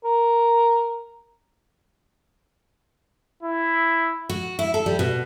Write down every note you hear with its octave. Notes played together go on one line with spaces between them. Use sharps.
A#4
E4
F#4
E4
A4
G3
B2